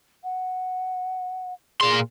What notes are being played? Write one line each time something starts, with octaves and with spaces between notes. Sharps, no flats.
F#5
A#2 G#4 C6